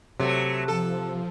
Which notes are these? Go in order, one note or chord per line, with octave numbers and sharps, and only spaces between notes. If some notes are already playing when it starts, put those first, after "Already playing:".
C3 F#3 A3
F3 A4